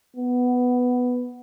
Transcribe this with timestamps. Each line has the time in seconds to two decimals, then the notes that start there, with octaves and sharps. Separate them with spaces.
0.17 B3